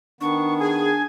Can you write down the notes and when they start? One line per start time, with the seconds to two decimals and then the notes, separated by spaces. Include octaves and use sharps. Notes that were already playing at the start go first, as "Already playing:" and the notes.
0.21 D#3 B3 D4 C#6
0.60 G#4 G#5